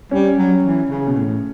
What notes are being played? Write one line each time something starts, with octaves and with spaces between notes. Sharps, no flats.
G3 C#4
F#3
E3
C#3
B2
A2